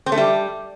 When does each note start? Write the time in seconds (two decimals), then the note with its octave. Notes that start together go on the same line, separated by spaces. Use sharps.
0.06 C4
0.12 A3
0.18 G3